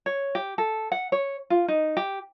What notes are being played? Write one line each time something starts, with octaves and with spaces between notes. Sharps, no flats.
C#5
G4
A4
F#5
C#5
F4
D#4
G4